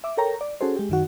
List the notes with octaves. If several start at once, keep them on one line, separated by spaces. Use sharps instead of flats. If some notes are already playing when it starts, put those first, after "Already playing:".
E5 D6
A4 A#4 C#5 G5 A#5
D5
C#4 F#4 G#4 A4 C5
G#3 G4
F#2 D#3 F#4